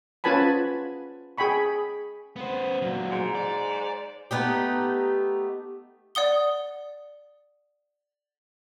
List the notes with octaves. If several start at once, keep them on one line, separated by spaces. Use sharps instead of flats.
C#4 F4 B4 G#5 A5 B5
G#4 G5 G#5 B5 C#6
B3 C5
A#2 F#3
G#2
D5
A3 B3 D#4 G4
D5 F#5 D#6 G7